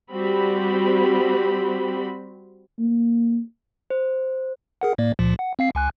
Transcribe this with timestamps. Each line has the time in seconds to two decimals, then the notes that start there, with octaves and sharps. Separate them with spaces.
0.11 G3 C4 F#4 G4 B5
2.79 A#3
3.90 C5
4.81 G#4 A#4 F#5
4.98 A2 A#3 D5
5.19 C#2 A#2 F3
5.39 F#5
5.59 C4 F5 C7
5.75 C#2 G#5 F#6